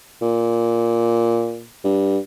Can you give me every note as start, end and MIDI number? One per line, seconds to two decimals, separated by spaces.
0.22 1.65 46
1.84 2.18 43